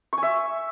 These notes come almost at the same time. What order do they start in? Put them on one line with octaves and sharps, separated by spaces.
C#6 G#5 E5